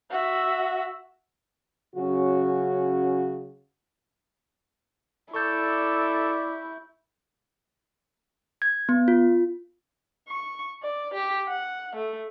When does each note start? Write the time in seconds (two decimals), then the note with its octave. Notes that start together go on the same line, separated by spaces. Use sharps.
0.11 F#4 E5
1.96 C#3 F#3 C#4 F#4
5.34 E4 A4 D5 C#6 G6
8.62 G#6
8.89 B3
9.08 F4
10.29 C#6
10.83 D5
11.14 G4
11.48 F#5
11.96 A3